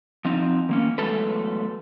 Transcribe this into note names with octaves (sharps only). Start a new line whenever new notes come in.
F3 C4 D#4
D#3 A#3 C#4
E2 F#3 G#3 A3 A4 B4